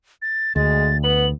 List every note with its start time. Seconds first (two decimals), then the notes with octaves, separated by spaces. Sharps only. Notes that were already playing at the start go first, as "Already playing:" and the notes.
0.22 A6
0.56 D2 G#3 A6
1.04 B3 F#7